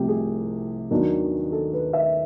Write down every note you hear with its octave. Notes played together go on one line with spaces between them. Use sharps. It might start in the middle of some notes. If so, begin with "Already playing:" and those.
Already playing: C2 C3 F3 A3 G4
G#4
D#2 D#3 F#3 B3 D4
A4
B4
E5